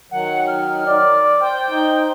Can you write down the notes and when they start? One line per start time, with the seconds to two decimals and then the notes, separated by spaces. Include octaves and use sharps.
0.11 D#3 F#3 F#5
0.47 D#4 F6
0.86 D5
1.41 C5 G5
1.71 D#4